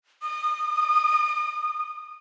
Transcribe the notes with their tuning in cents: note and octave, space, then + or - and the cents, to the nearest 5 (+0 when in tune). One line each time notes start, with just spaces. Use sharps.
D#6 -25